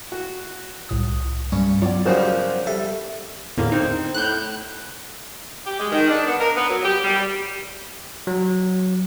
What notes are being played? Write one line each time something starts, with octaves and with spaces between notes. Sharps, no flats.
F#4
C2 A2 D#6
G2 C#4
F#3 B3 F4 C#5 D5
C#3 F3 G3 C#4 F#4 A#4 C5 F#5
G3 A4 E5
E2 A2 D3 A#3
C4 D#4
A2 F#6 G6
G4
G#3
D#3
D4
B3
A#4
B3
F#3
G4
G3
F#3